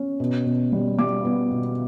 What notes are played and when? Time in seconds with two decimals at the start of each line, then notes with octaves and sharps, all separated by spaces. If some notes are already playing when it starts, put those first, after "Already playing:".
Already playing: C#4
0.20 B2
0.46 B2
0.72 G3
0.99 G3 D6
1.25 B3
1.51 B2